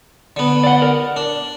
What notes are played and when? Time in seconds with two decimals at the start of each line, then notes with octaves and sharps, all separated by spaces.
0.36 D3 B3
0.64 D5 F#5
0.82 A#4
1.16 D4